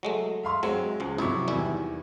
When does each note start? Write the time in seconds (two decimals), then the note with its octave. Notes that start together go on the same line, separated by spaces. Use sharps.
0.03 F#3 G#3 A3
0.43 E5 F5 C6
0.63 F#3 G#3 C4
1.00 C#2 F3
1.18 F2 C3 F#3 E4 C#6
1.48 E2 D#3 E3 G3 E4